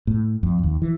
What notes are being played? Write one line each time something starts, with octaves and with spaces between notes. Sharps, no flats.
A2
F2
D#2
E3